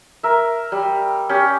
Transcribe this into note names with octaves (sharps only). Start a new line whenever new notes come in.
A#4 E5
G3
C#4 G4